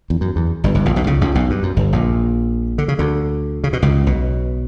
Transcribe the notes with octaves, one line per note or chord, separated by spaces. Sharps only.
E2
F#2
E2
G1 G2
G1 G2
A#1 A#2
B1 B2
C#2 C#3
C#2 C#3
B1 B2
G2
F#2
G1 G2
A#1 A#2
D3
C#3
D2 D3
C#3
B2
C#2 C#3
B1 B2